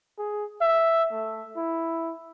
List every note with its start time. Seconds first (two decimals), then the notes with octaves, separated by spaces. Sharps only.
0.18 G#4
0.61 E5
1.12 A3
1.56 E4